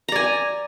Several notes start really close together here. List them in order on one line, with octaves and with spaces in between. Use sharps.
A#5 D5 G#5